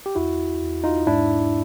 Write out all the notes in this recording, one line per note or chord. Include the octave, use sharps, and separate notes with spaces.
G4
E2 E4 F#4
E2
D#4 F4
G#2 D4 E4